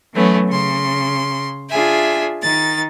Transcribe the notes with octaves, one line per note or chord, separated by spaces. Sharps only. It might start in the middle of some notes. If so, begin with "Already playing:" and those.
E3 F#3 A3 B3 C#4
C#3 C6
D4 F4 G#4 E5 G#5
D#3 D#4 A6